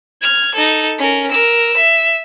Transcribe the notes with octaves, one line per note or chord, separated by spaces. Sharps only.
F6 G#6
D#4 A4
C#4 A#4
A#4 E6
E5